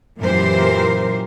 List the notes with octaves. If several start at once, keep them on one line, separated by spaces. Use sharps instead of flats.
F#2 A#2 E3 G4 A#4 C5